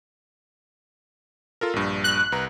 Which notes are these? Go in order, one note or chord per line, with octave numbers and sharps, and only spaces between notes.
F4 A4 A#4
A#1 G2
F#6
C2 B4 A#5